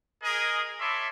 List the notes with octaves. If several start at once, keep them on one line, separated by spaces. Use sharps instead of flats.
G#4 A#4 D#5
C#5 E5 A5 B5 C6 D6